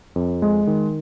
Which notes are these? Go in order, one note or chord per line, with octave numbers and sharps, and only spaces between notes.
F2
G#3
D#3